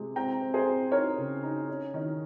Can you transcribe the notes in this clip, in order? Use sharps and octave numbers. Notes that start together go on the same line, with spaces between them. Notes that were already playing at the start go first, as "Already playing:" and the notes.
Already playing: C3 G#3
C4 G5 A#5
C4
G#4 C5
C4
D#4 A#4 C#5
C#3
D#4
C#4
D#3